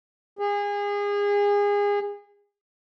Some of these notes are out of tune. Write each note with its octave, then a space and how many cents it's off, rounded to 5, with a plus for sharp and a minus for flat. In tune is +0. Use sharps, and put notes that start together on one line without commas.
G#4 -30